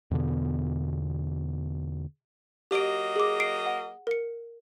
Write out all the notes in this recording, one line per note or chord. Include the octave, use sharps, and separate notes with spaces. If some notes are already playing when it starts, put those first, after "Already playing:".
E2 B2 D3 B3
F#3 A#3 G4 D#5 D7
G#4 D6
C7 D7
F#5
A#4 C#7